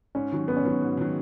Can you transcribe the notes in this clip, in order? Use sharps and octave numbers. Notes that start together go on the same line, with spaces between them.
G#2 C#4
D#3 F#3
G#2 B3
C#4
D#3 F#3 B3
G#2
D#3 F#3